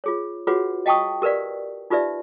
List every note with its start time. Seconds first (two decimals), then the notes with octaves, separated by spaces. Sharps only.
0.04 F4 G#4 C#5
0.47 F4 F#4 G#4 B4 C#5 F#5
0.86 D#5 F5 G5 A5 C#6 D#6
1.22 G4 A#4 B4 D5 F5
1.90 D#4 F4 G4 B4 D5 E5